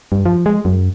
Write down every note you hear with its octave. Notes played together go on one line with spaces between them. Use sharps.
G2
F3
G#3
F#2